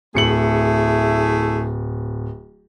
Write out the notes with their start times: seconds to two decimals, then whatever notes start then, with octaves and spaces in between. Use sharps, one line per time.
0.15 D1 A3 E4 G#4 C#7 F#7